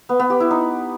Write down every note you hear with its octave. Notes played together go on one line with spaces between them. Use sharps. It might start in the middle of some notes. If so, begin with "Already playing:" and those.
B3
B3
G4
E4
D#4